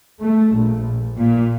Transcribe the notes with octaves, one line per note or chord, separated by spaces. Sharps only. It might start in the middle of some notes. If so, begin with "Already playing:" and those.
A3
A#1
A#2